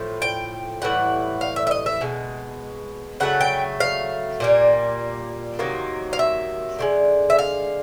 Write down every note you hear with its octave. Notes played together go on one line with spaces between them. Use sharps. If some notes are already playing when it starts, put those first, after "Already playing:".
Already playing: A2 F3
G5
A2 E3 G3 F#5
F5
E5
E5
D#5
E5
B2 G#3
C#3 F#3 A3 F#5
G5
F5
A#2 G3 A#3
C3 D#3 F#3 A#3
F5
E5
D3 F3 G#3
E5
F5